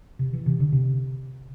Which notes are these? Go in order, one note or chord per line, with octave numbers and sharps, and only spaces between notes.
C3
E3
C3
D3
C3